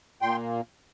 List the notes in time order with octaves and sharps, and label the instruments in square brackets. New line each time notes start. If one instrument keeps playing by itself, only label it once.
[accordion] A#2 A#3 G5 C6